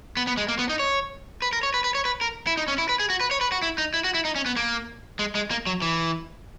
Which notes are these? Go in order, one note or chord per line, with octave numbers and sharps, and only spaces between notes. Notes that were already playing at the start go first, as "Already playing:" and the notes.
B3
B3
G#3
A#3
B3
D#4
C#5
B4
A#4
C#5
B4
B4
C#5
B4
A#4
E4
D#4
C#4
E4
B4
G#4
F#4
B4
C#5
B4
F#4
E4
D#4
E4
F#4
E4
D#4
C#4
B3
A#3
G#3
G#3
A#3
F#3
E3